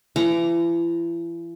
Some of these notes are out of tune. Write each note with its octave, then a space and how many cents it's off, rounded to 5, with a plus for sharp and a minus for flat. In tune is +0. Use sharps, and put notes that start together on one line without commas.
E3 +40 A#5 +0 D6 -5